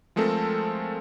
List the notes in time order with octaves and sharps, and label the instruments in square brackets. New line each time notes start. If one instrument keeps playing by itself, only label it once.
[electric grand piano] F3 G#3 A3 C4 A4 A#4